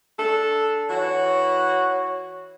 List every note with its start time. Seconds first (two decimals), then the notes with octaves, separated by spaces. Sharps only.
0.17 D4 A4
0.89 E3 F#4 C#5